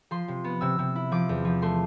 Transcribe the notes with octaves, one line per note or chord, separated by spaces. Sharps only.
F3 C6
C3
B3
C3 E6
C3
E4
F3 D6
E2
F3
A3 C6